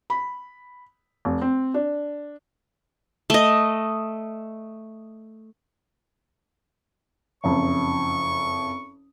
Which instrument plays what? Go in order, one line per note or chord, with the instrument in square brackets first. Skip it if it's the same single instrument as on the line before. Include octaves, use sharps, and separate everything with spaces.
[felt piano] B5
F1
C4
D4
[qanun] A3 D#5
[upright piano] F#1 F2 [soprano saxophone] C#6